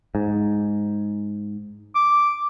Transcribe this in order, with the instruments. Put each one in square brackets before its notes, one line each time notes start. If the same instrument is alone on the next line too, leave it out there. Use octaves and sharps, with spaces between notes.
[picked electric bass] G#2
[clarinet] D6